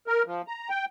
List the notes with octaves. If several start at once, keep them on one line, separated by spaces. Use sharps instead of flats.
A#4
F3
A#5
G5